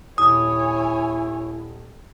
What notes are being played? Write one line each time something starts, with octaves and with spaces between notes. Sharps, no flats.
D#1 E4 C#5 G#5 D#6